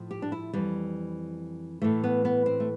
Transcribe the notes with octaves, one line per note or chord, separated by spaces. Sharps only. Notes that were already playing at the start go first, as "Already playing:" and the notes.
Already playing: A2 F3
G4
D4
E4
F2 E3 G3
A2 E3 A3
B3
B3
C4
A3